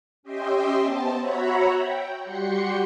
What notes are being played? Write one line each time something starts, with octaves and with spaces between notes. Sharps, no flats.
C#4 G4 D#5 E5 G5 C6
B3 C5 A5
F#4 C#5 E5 F#5 A#5 B5
G5
G3 F#4 G4 C6 C#7